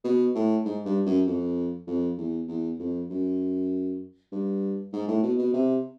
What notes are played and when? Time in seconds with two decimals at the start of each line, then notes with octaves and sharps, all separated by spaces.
0.05 B2
0.35 A2
0.65 G#2
0.86 G2
1.06 F#2
1.27 F2
1.87 F2
2.18 E2
2.48 E2
2.79 F2
3.10 F#2
4.32 G2
4.93 G#2
5.08 A2
5.23 B2
5.39 B2
5.54 C3